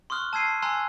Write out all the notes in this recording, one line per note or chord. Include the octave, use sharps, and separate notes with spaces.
C6 C#6 D#6 F6 F#6
A5 E6 G#6 C7 D#7
G#5 A#5 C6 E6 F#6